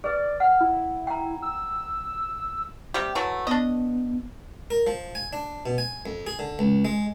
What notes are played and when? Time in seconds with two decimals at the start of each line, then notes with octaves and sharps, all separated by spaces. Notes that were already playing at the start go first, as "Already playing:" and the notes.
0.04 G#4 B4 D5
0.40 F#5 F6
0.61 E4
1.07 G5 A#5
1.42 E6
2.94 C3 G3 G4
3.15 E3 F#3 A3
3.47 B3 D4 D#5
4.70 A#4
4.87 F3
5.15 G#5
5.33 D4
5.66 B2
5.78 G#5
6.06 F2
6.27 G#4
6.39 D3
6.59 C#2
6.85 G#3